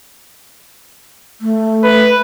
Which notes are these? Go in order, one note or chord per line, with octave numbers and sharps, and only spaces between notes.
A3
B4